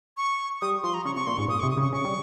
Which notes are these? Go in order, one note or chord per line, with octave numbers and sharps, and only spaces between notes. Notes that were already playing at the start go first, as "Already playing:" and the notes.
C#6
G3 D#6
F3 C6
A#5
C#3 C#6
C3 C#6
A#2 C6
G#2 C#6
A#2 D#6
C#6
C3
D#6
C#3 C#6
C#3 C#6
G3